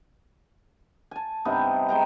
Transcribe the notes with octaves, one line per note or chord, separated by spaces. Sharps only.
G#5 A5
G2 C3 B3 D#4
G#3 G5 A#5